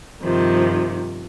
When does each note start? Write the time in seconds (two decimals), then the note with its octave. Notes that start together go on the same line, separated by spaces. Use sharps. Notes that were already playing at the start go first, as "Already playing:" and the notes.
0.23 G2 C3 D#3 F3